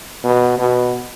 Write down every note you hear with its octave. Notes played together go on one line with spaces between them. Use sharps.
B2
B2